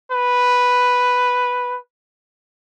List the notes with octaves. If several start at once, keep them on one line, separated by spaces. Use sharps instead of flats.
B4